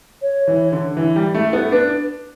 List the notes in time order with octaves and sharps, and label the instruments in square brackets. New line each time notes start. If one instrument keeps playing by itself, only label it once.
[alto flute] C#5
[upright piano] E3
D3
E3
G3
A3
B3
[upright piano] D4 [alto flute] B4